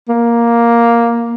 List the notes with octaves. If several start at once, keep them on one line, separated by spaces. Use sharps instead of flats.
A#3